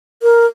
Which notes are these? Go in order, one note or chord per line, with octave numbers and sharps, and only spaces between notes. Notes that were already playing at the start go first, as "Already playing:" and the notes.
A#4